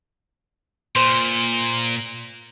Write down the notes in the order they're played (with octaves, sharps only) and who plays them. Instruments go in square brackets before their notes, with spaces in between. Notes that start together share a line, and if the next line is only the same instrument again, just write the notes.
[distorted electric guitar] A#2 [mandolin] C5